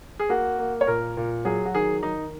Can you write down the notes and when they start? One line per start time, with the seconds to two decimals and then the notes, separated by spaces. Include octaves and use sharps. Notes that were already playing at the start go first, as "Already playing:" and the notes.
0.19 G#4
0.29 A#3 F#4
0.59 A#3
0.81 C#5
0.87 A#2 A#4
1.17 A#2
1.45 F#3 G#4
1.66 F#4
1.74 D#3 G#4
2.03 D#3 D#4